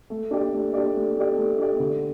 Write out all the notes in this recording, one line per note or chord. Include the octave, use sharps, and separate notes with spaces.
A3
D4 G4 D5
A3
D4 G4 D5
A3
D4 G4 D5
A3
D4 G4 D5
D3